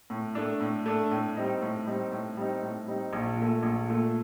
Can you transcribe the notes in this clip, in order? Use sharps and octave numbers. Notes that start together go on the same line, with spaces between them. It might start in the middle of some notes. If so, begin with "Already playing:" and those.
A2
A3 D4
A2
A3 D4
A2
G3 C4 D#4
A2
G3 C4 D#4
A2
G3 C4 D#4
A2
G3 C4 D#4
A#1
A#2 A3
A#1
A#2 A3